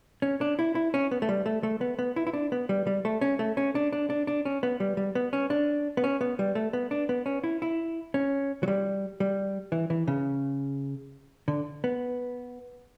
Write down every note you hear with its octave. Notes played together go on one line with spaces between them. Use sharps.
C#4
D4
E4
E4
C#4
B3
A3
G3
A3
A3
B3
B3
E4
E4
D4
B3
G3
G3
A3
C#4
A3
C#4
D4
D4
D4
D4
C#4
B3
G3
G3
B3
C#4
D4
B3
C#4
B3
G3
A3
B3
D4
B3
C#4
E4
E4
C#4
F#3
G3
G3
E3
E3
C#3
D3
B3